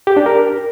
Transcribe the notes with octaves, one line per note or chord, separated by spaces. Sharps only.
G4
D4
A#4